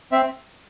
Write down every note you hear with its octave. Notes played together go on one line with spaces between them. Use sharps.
C4 E5